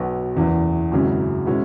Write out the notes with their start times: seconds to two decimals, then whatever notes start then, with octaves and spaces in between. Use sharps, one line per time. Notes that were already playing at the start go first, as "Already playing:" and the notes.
Already playing: B1 B2 B3
0.35 F#1 E2 E3
0.91 G#1 F#2 C#3 F#3 E4
1.46 B2 G#3 C#4 E4